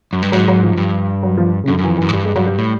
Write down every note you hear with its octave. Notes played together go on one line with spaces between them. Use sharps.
F#2
G2
G#2 F#3
F#3
F3
F#2
G2
F#3
F3
C#3
F#2 D3
F#2 E3
F2
F#2 E3
G#2
G2 G3
G#3
G2 F#3
G3
A2